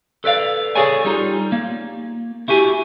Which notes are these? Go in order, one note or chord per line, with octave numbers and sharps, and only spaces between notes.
A4 B4 D5 F5
G#4 A4 C#5 D5 G#5
G3 D#4 F4
A#3
E4 F#4 G4 G#5